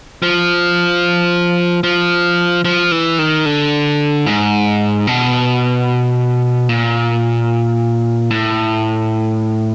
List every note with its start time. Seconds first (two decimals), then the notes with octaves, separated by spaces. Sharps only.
0.22 F3
1.83 F3
2.65 F3
2.92 E3
3.19 D#3
3.45 D3
4.26 G#2
5.07 B2
6.69 A#2
8.30 A2